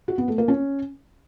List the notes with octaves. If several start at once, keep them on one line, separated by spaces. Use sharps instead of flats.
F#4
B3
A3
A#3
C#4